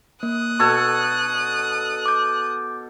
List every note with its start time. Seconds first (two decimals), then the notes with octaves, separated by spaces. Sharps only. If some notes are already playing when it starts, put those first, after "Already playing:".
0.23 A#3 D#6 F#6
0.59 B2 A4 C#6 G#6
2.06 D6 G6